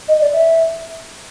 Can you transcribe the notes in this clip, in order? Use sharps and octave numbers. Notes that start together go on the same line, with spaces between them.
D#5
D5
E5